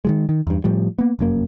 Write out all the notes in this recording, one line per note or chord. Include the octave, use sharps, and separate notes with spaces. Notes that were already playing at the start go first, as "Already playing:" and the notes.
D#3 F3 G#3
D#3
E2 G2
A2 F3 G3
A#3 B3
F1 F#2 A#3